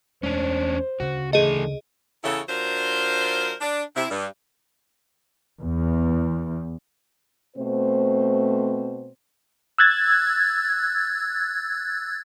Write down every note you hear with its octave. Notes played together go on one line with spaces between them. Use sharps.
E2 G#3 A3 C#4 D4 C5
D2 C#3 F#4
D3 E3 A3 G#4 A4 D#5
E2 C#3 E3 E4 A4 C#5
F#3 D4 F4 A#4 C5
D4
C3 E4
G2
E2
B2 A3 C4 C5
E6 F#6 G#6 A6